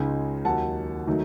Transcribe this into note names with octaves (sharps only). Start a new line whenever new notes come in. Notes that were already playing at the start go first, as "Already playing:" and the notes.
Already playing: C#2 C#3 G#3 D#4 G#5
D#2 D#3 F#3 F#5 A5
D#3 F#3 A3 D#4